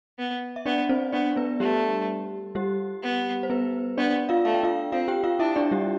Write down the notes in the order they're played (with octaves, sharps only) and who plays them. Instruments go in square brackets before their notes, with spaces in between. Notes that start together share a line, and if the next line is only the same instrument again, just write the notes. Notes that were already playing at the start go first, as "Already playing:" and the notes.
[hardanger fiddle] B3
[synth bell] E5
[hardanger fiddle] B3 [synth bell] D4 D5
[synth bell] C4 C5
[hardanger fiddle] B3 [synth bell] D4 D5
[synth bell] B3 B4
[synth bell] G3 G4 [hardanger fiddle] A3
[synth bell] G3 G4
[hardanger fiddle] B3
[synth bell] C5
B3 B4
[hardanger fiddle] B3 [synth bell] D4 D5
[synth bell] F4 F5
[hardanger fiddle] A3 [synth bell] F5
[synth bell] G5
F4 F5
[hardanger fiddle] C4 [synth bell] F4 F5
[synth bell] G4 G5
F4 F5
[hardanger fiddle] D4 [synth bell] E4 E5
[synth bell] D4 D5
G3 G4